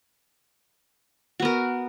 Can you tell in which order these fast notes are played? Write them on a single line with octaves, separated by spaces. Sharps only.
F#4 B3 A#4